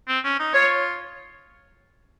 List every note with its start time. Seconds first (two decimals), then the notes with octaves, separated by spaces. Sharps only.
0.08 C4
0.24 C#4
0.39 D#4
0.54 F4 C#5